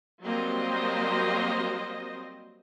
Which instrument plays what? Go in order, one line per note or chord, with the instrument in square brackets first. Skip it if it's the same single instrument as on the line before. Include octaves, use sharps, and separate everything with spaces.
[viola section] F#3 G3 A#3 C4 C5 D#5